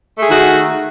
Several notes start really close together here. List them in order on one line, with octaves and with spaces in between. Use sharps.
A3 G#4 D#3 F#4